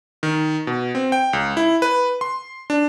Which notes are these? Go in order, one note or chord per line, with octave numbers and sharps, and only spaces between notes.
D#3
B2
C4
G5
C#2
E4
B4
C6
D4